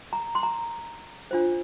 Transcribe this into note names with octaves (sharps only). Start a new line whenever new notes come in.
A#5
C6
A#5
D4 F4 C5